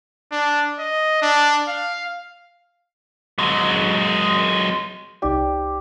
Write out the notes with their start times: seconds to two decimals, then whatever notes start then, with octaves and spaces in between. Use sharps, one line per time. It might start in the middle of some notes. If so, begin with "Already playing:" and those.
0.32 D4
0.79 D#5
1.22 D4
1.68 F5
3.39 F#3 G#3
5.22 C2 D#4 G4 D5